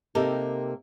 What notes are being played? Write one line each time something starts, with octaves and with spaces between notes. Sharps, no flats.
C3 A#3 D#4 G4 A4 A#4